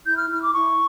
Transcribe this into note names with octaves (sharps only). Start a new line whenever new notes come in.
E4 G6
F6
E4 F6
D6
E4 C#6